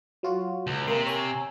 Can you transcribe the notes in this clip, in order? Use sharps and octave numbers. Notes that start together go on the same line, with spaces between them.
F#3 F4 F#4
C#2
C3 A#3 A#4 C6
C#5 G#5 E6